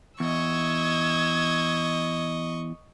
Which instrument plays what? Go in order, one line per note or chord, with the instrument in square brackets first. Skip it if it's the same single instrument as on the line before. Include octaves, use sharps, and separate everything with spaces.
[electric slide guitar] E2 [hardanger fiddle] D#5 C#6 [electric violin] E6 G#6